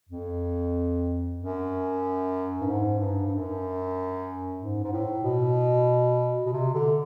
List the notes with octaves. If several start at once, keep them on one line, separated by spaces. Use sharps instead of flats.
F2
F#2
G2
G#2
G2
G2
F#2
G#2
G#2
A2
B2
B2
C3
D3